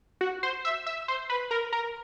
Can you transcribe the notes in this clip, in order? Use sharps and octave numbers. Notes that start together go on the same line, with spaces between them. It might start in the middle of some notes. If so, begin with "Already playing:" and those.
F#4
C5
E5
E5
C5
B4
A#4
A#4